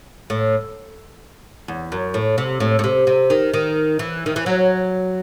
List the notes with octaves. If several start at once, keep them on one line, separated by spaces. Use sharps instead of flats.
A2
E2
F#2
A2
C3
A2
A2
C3
C3
D#3
D#3
E3
D#3
E3
F#3